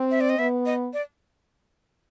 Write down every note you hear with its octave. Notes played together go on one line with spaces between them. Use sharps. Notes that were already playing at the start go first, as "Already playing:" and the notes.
Already playing: C4
E5
D5
D#5
B3 E5
D#5
D5